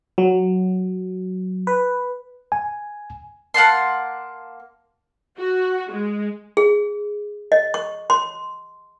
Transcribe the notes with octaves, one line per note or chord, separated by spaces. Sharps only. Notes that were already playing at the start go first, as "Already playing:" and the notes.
F#3
B4
G#5
A#3 F#5 A5 C6
F#4
G#3
G#4
D#5
C#6
C6